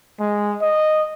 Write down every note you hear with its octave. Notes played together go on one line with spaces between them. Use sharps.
G#3
D#5